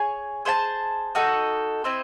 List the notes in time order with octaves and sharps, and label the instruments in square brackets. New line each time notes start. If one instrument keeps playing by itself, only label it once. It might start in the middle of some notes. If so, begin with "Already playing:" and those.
Already playing: [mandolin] G#4 C#5 G#5
G#4 C5 E5 A5
D#4 F#4 A4 D#5
C4 E4 C5 D#5